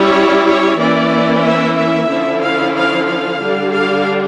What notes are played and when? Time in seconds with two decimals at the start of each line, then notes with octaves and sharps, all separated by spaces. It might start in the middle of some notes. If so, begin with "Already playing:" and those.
Already playing: G3 C#4 E4 C#5
0.46 C#5
0.78 E3 A#3 C#4 E4 D5
1.44 E5
1.77 E5
2.09 D3 F3 C#4 E4
2.41 F5
2.75 F5
3.07 F5
3.39 D3 G3 D4
3.72 F5